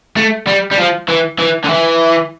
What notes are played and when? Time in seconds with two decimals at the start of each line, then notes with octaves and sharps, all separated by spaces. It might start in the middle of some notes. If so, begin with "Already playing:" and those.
0.16 A3
0.47 G3
0.72 G3
0.78 F3
1.09 E3
1.39 E3
1.64 D3
1.69 E3